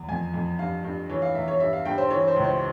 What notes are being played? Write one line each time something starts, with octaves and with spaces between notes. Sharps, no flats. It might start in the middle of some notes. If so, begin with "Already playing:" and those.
Already playing: E2
F2 G#5
F2
G2 F5
G2
E3 C#5
F5
E2 E5
C#5
G2 E5
F5
G2 G5
C5
E3 C#5
C5
C#2
C5